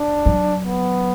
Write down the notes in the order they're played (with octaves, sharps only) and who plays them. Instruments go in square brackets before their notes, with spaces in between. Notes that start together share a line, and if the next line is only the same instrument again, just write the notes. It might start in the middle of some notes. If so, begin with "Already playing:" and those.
Already playing: [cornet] D4
[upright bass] F#3
[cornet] B3